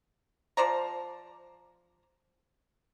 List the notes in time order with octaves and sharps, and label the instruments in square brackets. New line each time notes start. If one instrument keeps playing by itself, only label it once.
[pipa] F3 C5 D5 A#5